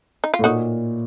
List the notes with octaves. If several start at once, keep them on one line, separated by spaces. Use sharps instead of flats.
D#4
F4
A2
A#2 D#4 F#4